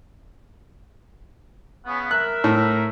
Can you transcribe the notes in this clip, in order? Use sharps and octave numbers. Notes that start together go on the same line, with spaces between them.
C#3 B3
A#4 E5 F#6
A2